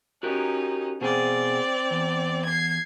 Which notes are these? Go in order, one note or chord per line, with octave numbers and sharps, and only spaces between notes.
C#4 D#4 F#4 G4 A#4
B2 C4 G#4 D5
E2
G#6 C7